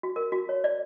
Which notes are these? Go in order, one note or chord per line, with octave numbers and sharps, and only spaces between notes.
F#4
A#4
F#4
C#5
D5